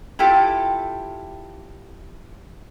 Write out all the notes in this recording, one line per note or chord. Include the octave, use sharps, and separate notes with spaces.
E4 F4 G4 A4